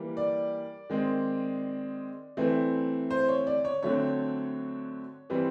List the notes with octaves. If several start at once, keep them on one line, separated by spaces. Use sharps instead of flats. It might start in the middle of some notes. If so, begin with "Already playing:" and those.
Already playing: E3 G3 A#3
D5
D#3 G#3 C4
E3 A3 C4
C5
C#5
D5
C#5
D3 F#3 A3 C4 C#5
E3 G3 C4